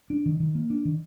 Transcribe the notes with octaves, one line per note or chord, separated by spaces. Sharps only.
D4
D#3
D#3
A#3
D4
D#3